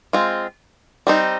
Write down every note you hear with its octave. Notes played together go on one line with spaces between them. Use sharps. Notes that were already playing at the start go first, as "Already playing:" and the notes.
G#3 C4 F4
G3 C4 D#4